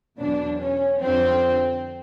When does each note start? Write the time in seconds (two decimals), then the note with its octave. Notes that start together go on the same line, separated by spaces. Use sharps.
0.19 E2 B2 F#3 D4
0.60 C#4
1.00 F2 D3 F3 C4